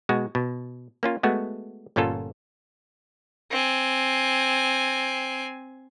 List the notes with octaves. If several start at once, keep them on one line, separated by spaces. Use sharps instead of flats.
B2 G#3 F#4
B2
A#3 C#4 F4
G#3 A3 B3 F#4
G1 A#2 C#4 F4 A4
C4 G#5